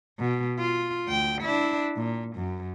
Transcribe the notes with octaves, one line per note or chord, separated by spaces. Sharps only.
B2
F4
D2 G5
D4 E4
A#2
F#2